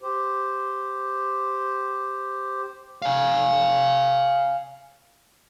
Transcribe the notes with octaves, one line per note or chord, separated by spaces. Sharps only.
G4 C5
F5 G#5